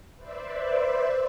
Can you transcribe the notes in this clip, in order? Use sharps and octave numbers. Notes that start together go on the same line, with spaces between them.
B4 C5 D5 E5